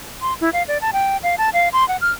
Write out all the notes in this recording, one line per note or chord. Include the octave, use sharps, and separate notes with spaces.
C6
E4
F5
D5
A5
G5
F5
A5
F5
C6
F#5
F6